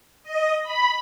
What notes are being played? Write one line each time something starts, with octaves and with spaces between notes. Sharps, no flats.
D#5
B5